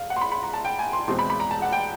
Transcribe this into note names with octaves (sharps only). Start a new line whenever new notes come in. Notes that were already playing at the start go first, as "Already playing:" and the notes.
Already playing: F5
F#5
C6
B5
B5
A#5
A5
G5
G#5
C6
E2 B2 G#3 C4 C6
B5
B5
A#5
A5
F#5
G5